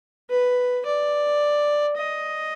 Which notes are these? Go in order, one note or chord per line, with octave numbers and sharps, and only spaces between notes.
B4
D5
D#5